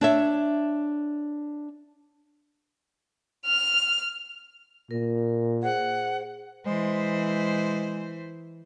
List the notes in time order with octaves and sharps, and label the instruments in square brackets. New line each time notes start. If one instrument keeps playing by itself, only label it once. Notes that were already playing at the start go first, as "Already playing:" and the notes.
[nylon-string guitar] D4 C#5 E5
[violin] F6
[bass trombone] A#2 [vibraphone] A#4
[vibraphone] G#4 C5 [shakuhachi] F#5
[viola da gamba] E3 C5 [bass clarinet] G#3